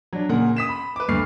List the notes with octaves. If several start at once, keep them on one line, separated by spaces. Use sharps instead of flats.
F#3 D4
A#2 C#3 G#4 A#4 F#5
D#6 B6 E7
B5
B4 D6
D2 G2 B5 C#6 F6 C7